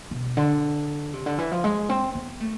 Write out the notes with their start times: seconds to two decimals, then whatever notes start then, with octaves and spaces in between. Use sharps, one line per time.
0.11 B2
0.37 D3
1.14 C3
1.26 D3
1.38 E3
1.52 F3
1.64 G#3
1.89 C4
2.15 B3
2.40 A3